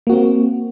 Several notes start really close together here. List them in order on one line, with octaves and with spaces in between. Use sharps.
A#3 F#4 C4